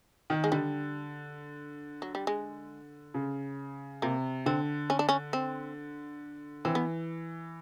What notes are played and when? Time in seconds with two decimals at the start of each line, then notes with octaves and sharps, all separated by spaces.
0.30 D#3
0.44 G#3
0.52 D3 G3
2.02 F#3
2.15 G3
2.27 G#3
3.14 C#3
4.02 C3 A#3
4.46 D3 C4
4.90 C#4
4.99 D4
5.09 C#4
5.33 C4
6.65 E3 C4
6.75 B3